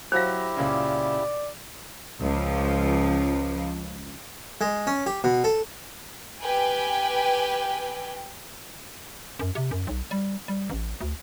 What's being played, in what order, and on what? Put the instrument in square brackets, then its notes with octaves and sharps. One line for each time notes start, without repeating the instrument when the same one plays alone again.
[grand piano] F#3 F#4 A#6 [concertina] E4 G4 [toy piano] C5 F5
[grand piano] C#2 A#2 C#3 [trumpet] D5
[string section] C#2 F3
[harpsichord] G#3
C#4
G4
B2
A4
[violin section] G4 B4 G5 G#5
[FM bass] F#2
C3
F#2
B1
G3
G3
A1
D2